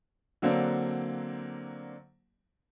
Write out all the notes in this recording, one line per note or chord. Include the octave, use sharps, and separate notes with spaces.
D3 F#3 A#3 C4 D4